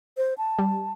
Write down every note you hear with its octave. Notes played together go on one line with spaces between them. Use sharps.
C5
A5
G3